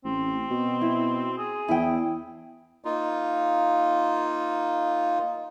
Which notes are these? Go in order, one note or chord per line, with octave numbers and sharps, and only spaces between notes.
A1 C4
B2
E4
G#4
E2 E4 G5
A#3 D#4 F4